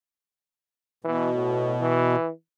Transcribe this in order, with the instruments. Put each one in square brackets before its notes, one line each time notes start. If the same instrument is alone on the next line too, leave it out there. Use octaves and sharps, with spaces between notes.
[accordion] B2 [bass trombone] E3
[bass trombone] A2
E3